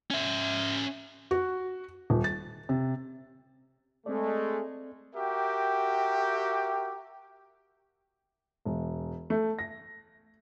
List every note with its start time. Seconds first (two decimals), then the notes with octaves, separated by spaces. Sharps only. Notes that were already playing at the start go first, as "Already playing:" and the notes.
0.11 C#4 E5
1.31 F#4
2.10 D#1
2.24 A6
2.69 C3
4.06 G#3 A3 C4 A4 D5
5.15 F#4 G4 A#4 E5 G5
8.65 E1
9.30 A3
9.59 A#6